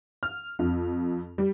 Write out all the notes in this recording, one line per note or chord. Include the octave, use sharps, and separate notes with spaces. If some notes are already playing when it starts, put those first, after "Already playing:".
F6
F2
G3